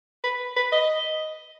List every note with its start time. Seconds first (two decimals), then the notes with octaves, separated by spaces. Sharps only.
0.24 B4
0.56 B4
0.72 D#5